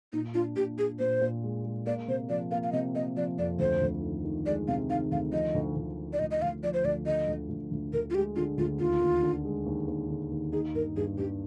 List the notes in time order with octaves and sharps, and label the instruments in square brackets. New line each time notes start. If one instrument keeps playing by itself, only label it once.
[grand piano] A#2 [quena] D#4
[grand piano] D4 [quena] F4
[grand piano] A#2 [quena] G4
[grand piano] D4 [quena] G#4
[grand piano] A#2 [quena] C5
[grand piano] A#2
G#3
G#3
[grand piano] A#3 [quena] D5
[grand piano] C3 [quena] C5
[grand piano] F3 [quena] D5
[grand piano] A#3 [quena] F5
[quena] F5
[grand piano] C3 [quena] D#5
[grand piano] A#3 [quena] D#5
[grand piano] F3 [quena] D5
[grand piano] F2 [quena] D5
[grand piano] D2 [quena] C5
[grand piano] D2
D#3
D#3
[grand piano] G#3 [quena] D5
[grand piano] C3 [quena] F5
[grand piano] D#3 [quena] F5
[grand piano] D2 [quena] F5
[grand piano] F3 [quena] D#5
[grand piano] D2
D2
F3
[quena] D5
[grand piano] D2 [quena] D#5
[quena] D#5
[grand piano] D2 [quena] F5
[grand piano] F3 [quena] D5
[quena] C5
[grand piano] D2 [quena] D5
[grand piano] D3 [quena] D#5
[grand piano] D2
D2
D2
[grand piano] D2 [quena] A#4
[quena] F4
[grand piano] G#3 [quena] G4
[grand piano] D3 [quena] F4
[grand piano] D2 [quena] F4
[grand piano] D#2 [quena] F4
[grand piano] D#2
D3
G#3
D#2
D#2
D3
D#2
[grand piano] D#4 [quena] G#4
[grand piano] G2 [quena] A#4
[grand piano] G2 [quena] G#4
[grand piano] G2 [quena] G4